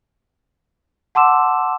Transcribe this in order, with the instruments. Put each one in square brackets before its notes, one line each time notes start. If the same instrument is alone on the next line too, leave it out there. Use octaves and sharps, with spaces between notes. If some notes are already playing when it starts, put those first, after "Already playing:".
[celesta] F#5 A5 C6 D6 E6 E7